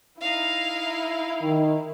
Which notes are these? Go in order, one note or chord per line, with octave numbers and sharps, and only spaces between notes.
D#4 E4 F5
D#3